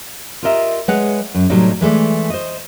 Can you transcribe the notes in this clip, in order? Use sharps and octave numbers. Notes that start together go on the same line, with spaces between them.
F4 G4 A#4 D#5 E5
G#3 B4 C#5 F#5
F#2
A2 C3 F#3 G3 D#4
E3 G#3 A3 D5
C5 D#5